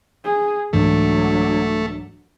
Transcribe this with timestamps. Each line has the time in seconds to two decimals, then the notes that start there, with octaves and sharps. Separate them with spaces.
0.25 G#4
0.73 C2 G#2 E3 F#3 A3 D4